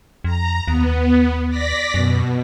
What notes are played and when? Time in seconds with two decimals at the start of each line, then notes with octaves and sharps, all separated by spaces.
0.24 F2 A#5
0.68 D#2 B3
1.49 D5 A#6 B6
1.94 F#2 B2